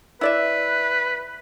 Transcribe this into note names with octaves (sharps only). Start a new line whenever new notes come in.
E4 B4 D5 E5